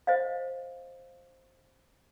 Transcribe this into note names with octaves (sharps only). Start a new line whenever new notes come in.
C5 D#5 F5